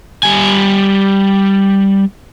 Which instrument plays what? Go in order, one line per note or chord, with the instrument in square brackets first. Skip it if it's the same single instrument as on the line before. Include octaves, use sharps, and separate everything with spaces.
[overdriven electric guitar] G3 G#5